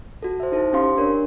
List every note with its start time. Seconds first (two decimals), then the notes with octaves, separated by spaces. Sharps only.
0.23 F#4 A4
0.40 C5 E5
0.52 D#4 E4 A4 C5
0.73 C#4 G4 F5 C6
0.97 D4 A#4 C#5